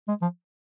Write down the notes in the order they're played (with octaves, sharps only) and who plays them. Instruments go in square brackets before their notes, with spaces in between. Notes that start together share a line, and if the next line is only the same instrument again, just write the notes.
[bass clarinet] G#3
F3